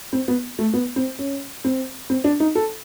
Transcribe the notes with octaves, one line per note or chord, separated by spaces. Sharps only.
C4
B3
A3
B3
C4
C#4
C4
C4
D4
D#4
A4